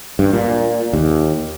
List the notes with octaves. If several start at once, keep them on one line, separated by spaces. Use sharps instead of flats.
G2
A#2
D#2